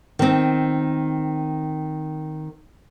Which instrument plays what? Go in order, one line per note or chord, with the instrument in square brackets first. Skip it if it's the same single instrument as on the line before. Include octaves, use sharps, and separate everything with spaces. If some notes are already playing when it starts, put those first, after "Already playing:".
[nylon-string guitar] D#3 C4